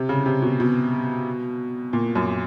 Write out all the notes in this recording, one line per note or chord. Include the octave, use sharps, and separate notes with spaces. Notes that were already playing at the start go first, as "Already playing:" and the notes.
Already playing: C3
C#3
C3
B2
B2
A#2
F#2